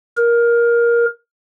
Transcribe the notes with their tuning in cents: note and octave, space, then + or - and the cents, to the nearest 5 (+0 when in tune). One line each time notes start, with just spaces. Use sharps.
A#4 +15